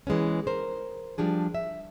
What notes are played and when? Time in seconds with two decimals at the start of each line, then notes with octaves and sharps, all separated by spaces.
0.07 E3 G#3 B3 C#4
0.47 A#4 C5
1.18 F3 G3 D4 G#4
1.55 E5